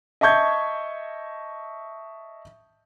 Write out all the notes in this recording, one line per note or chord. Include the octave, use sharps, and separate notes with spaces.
D#5 E5 A5 C#6 G6 G#6